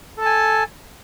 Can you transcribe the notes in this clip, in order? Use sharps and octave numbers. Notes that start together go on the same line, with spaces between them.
A4 G#5 A5